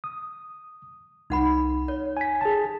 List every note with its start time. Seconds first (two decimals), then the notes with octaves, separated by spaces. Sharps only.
0.04 D#6
1.30 C2 D#4 F#5 B5
1.88 C#5
2.17 G#5 B6
2.41 G#4 A5